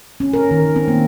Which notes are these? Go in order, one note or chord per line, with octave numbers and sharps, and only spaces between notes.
C#4
A#4
D#3
C4
A#3